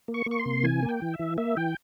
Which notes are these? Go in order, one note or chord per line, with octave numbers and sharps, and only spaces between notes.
A#3
C#6
A#3
C#6
C6
C3
E3 G#5
A#3
G5
E3
E5
E3
A#3 E5
E3 G5